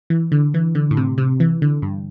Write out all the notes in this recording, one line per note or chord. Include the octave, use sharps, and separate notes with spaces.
E3
D3
E3
D3
A2
C3
C3
E3
D3
G2